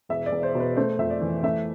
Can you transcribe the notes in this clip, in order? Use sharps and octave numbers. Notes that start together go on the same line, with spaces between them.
E1 E5
D5
E1
C5
B2
B4
A3 C5
F2 E5
D5
E3
A3 E5